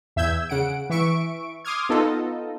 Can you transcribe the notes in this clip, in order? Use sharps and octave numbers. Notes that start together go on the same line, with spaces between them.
E2 E5 E6 G6 G#6
C#3 F#5 D7
E3 E5 C#6 D7
C6 D6 D#6 F6 G#6
B3 D#4 F4 A4 D#5